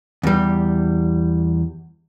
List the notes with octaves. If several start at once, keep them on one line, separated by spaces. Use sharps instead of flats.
E2 G3